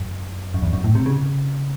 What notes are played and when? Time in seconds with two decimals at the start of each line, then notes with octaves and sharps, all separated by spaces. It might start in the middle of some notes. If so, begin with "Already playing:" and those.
Already playing: F#2
0.54 F#2
0.62 E2
0.73 F#2
0.84 A2
0.95 C3
1.06 C#3